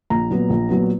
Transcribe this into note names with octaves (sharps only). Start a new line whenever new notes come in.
A#1 A#5
A#2 F#3 B3
A#1
A#2 F#3 B3